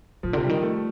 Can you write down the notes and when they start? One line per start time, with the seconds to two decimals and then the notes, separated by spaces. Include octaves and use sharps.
0.23 A2 F3
0.33 D3
0.37 C3
0.43 G3
0.49 D#3
0.58 G3
0.63 A3